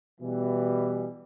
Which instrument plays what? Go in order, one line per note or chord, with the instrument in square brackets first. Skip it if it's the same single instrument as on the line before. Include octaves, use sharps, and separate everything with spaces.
[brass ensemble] B2 E3 G3